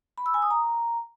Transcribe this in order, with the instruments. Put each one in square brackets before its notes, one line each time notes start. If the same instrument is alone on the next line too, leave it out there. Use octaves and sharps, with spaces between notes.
[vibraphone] B5
E6
G#5
D#6
A#5